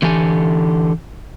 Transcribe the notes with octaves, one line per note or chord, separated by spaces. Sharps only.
D3 E3 G4 A4 G#5